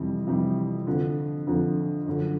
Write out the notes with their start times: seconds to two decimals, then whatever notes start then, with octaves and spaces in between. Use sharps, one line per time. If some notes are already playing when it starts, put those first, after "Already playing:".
Already playing: F2 C3 E3 G3
0.27 F2 C3 E3 G3
0.87 F2 D3 F3
1.47 F2 D3 F3
2.06 F#2 D3 F3